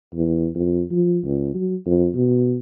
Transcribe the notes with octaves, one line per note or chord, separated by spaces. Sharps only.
E2
F2
F3
C#2
F#3
F2
B2